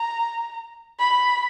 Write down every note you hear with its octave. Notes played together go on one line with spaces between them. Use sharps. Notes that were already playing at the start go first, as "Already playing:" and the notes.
Already playing: A#5
B5